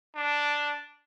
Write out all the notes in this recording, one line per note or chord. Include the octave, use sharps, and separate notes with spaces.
D4